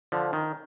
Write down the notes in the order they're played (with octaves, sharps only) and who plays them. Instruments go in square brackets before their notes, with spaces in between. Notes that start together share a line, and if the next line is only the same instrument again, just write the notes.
[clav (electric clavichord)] D3 F3
D#3